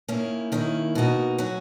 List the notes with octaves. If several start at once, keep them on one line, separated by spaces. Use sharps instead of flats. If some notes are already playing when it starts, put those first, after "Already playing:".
D#3 A#3 C#4 E4
D#3 A#3 C#4 E4
B2 A#3 D#4 F#4
F#3 C#4 F#4